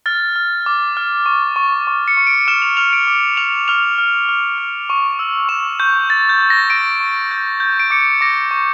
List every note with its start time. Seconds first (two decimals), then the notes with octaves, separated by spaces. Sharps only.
0.06 F6 A6
0.36 F6
0.66 D6
0.97 F6
1.26 C#6
1.56 C#6
1.87 C#6
2.08 C#7
2.17 C#6
2.27 D7
2.48 F6 E7
2.62 F7
2.77 F6 F7
2.93 D7
3.07 D6
3.37 F6 F7
3.68 F6 F7
3.98 F6
4.29 F6
4.58 F6
4.90 C#6
5.19 E6
5.49 C#6 E7
5.80 C#6 G6
6.10 G6 A6
6.29 G6
6.41 G6
6.50 A#6
6.70 C#6 D7
7.00 C#6
7.31 G6
7.60 G6
7.80 D7
7.90 D6 C#7
8.21 D6 A#6
8.51 C#6